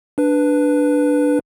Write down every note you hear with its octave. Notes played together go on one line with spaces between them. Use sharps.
D4 B4